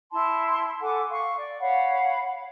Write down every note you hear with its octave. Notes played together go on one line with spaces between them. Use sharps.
E4 A5 C6
A4 F#5 G#5 D6
F5 C#6
D5
C#5 F5 F#5 B5